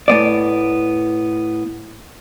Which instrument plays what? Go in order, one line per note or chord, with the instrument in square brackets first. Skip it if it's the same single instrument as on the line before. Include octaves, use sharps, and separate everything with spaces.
[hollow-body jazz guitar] A2 B3 D5